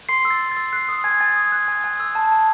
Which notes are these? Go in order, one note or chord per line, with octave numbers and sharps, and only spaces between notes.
C6 C7
E6
A6
E6
A6
E6
F#6 C7
D#6
G#5 G#6
G#5 A6
D#6
F#6
G#5
G#5
E6
A5
A5